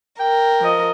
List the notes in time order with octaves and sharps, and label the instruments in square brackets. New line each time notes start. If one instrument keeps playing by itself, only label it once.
[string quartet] A#4 [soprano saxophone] G5
[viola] F3 D#5